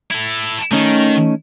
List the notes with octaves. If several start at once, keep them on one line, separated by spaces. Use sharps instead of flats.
E4 A4
D#3 A3 C#4 D#4